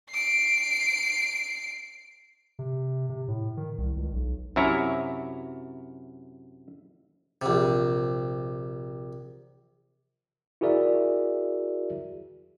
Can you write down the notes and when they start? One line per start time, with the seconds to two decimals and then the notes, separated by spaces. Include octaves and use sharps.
0.10 C7 D7
2.59 C3
3.10 C3
3.28 A2
3.57 D#3
3.78 C2
3.97 C#2
4.13 B1
4.56 F#2 C3 E4 C#5 A#5
7.42 A#1 C3
10.61 E4 F#4 G#4 A#4 D5 E5